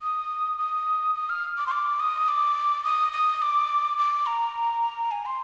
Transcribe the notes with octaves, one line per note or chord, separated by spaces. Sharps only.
D#6
D#6
D#6
F6
D6
C6
D6
D#6
D6
D#6
D#6
D6
D6
A#5
G#5
C6